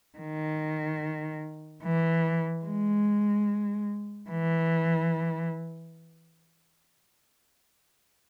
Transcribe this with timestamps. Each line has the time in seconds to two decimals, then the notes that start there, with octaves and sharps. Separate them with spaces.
0.18 D#3
1.83 E3
2.65 G#3
4.30 E3